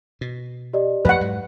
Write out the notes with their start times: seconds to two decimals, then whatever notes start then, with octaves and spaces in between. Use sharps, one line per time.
0.21 B2
0.73 G4 D5 D#5
1.05 F2 F3 A3 B4 F#5
1.21 G#2 F#3